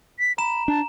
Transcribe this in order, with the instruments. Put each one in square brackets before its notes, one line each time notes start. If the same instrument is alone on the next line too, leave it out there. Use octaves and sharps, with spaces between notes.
[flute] B6
[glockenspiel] A#5 E7 [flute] B5
[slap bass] D4 [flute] A5